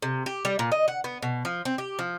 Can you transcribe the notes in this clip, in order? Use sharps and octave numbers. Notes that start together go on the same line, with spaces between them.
C3
G4
G3
A#2
D#5
F#5
B3
B2
F3
C4
G4
F3